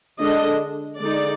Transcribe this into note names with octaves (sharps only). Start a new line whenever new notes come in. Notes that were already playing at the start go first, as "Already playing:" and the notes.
D3 G#3 D4 D#5
D3 G#3 D#4 D5